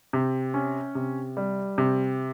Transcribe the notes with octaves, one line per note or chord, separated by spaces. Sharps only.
C3
C#4
C3
G3
C3